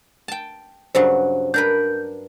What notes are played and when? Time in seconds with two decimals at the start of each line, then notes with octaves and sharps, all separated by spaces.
0.28 G5 A5
0.95 G2 C#3 F#3 C5
1.54 D4 A#4 B4 G6